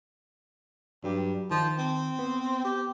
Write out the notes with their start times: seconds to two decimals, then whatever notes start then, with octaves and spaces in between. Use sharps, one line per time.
1.04 G2 F#3 G4
1.51 D#3 F3
1.79 C4
2.19 B3
2.64 G4